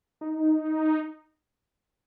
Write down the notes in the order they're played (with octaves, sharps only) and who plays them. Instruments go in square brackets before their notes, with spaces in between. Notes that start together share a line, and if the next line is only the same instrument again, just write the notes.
[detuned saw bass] D#4